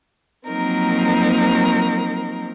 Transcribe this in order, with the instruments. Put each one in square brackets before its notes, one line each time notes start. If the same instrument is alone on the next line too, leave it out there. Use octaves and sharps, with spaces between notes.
[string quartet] F3 F#3 A#3 C4 D#4 A#4